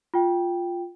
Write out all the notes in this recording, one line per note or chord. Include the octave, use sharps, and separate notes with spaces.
F4 G5